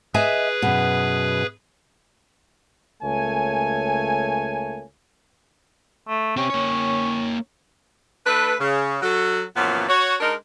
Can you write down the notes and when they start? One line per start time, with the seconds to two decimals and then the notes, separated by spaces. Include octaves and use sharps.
0.14 G#4 B4 D#5 E5 G#5
0.62 F#2 B2
3.02 C#2 A3 A#3 C#5 G#5
6.08 A3
6.37 C4 C#4 G4
6.50 A#3 C#5
8.26 A3 D4 A4 B4
8.60 C#3
9.02 F#3 F#4 A4
9.57 F#2 A#2 E3 F3 B3 C#4
9.88 F#4 C#5
10.20 G#3 D4 D#4 A#4